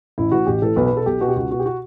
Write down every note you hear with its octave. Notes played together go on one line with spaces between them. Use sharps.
A1 E4
A2 E3 F#4
A1 G4
A2 E3 A4
B1 B4
B4
B2
A4
B1 G4
B2 F#4
G4
C#2 F#4
B2 F#4
G4
F#4